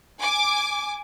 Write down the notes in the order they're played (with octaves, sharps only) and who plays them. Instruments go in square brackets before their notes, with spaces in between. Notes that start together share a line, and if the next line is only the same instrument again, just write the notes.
[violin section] G#5 D6